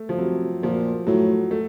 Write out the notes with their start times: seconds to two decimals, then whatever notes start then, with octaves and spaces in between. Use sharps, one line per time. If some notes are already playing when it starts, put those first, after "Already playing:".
Already playing: A3
0.09 F3
0.18 C3 F#3
0.62 A#2 F3
1.07 A2 F#3
1.51 A3